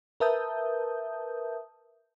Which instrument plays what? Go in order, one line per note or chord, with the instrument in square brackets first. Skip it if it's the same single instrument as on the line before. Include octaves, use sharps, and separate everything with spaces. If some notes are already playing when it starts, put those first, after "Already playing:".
[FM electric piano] A#4 B4 E5 A5 D#6 G6